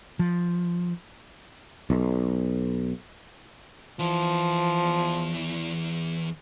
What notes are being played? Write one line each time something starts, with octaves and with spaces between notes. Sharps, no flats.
F3
B1
E2 E3 F3